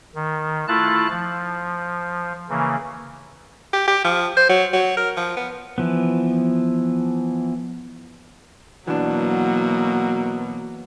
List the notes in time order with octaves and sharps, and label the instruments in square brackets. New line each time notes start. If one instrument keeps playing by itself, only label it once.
[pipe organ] D#3
A3 E4 F4 A5 F#6
F3
C#3 E3 A#3
[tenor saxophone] G4
G4
F3
C5
F#3
F#3
A#4
F3
B3
[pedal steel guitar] E3 F3 B3
[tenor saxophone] B2 [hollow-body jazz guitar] E3 D4 [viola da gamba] F#3 A#3